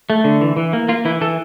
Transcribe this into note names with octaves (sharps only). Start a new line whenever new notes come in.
A3
D3
E3
E3
A#3
A#3 F4
E3 E4
E3 A4